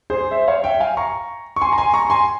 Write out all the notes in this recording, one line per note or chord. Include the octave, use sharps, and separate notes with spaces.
G#4 C5
C5 E5
C#5 F5
E5 G5
F5 G#5
A#5 C#6
C#6
G#5 C6
A#5
G#5 C6
A#5 C#6
G#5 C6